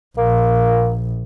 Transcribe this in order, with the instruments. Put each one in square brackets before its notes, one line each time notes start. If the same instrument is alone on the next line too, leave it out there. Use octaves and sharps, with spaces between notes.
[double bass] A#1 [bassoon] A#3